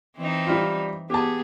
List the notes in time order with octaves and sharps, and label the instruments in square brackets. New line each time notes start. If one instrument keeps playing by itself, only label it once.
[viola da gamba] E3 C4 D#4
[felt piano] G3 F4
[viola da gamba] B3 G#4 [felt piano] G4 A5